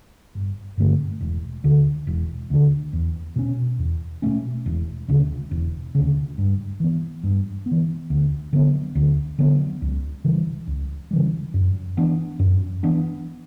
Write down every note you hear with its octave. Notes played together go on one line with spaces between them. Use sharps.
G1
G2 D3 A3
E1
D2 D3
E1
D2 D3
E2
B2 A3 C#4
E2
B2 A3 C#4
E1
D2 C#3
E1
D2 C#3
G2
E3 B3
G2
B3
E3
D2
D3 F#3 B3
D2
D3 F#3 B3
C#2
C#3 E3 G3
C#2
C#3 E3 G3
F#2
E3 B3 D4
F#2
E3 B3 D4